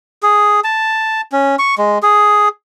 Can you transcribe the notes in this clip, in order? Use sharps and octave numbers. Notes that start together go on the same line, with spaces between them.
G#4
A5
C#4
C#6
G#3
G#4